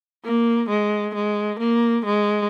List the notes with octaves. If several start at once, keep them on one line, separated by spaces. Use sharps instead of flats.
A#3
G#3
G#3
A#3
G#3